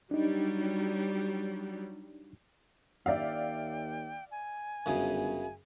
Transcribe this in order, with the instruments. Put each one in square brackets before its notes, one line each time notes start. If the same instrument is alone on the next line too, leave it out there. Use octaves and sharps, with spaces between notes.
[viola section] F#3 G3 [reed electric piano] D4 D#4
[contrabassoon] D#2 [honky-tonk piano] D5 E5 F5 [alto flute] G5
[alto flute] G#5
[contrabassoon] G1 [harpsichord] F#2 C#3 G#4